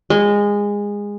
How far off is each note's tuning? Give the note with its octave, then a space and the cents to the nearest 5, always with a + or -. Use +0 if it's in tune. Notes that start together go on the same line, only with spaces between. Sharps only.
G#3 -20